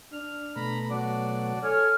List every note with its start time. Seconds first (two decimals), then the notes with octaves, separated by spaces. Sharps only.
0.12 D4 F6
0.56 B2 A3 A#5 B5
0.90 F#3 D4 F#4 D5
1.64 A4 C#5 G#5 F6